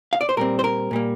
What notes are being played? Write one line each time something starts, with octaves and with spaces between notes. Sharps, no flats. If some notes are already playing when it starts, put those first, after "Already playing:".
F5
D5
C5
A#2 G3 C4 A#4
C5
A#4
A#2 G3 A#3